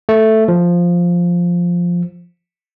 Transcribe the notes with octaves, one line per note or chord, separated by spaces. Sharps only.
A3
F3